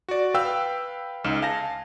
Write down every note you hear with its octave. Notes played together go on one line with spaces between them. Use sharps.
F#4 D5
B4 F5 G5 E6
C#2 D#4 F6 E7
F5 G#5 A5 A#6